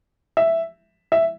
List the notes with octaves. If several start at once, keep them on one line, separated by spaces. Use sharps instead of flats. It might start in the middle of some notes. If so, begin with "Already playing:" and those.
E5
E5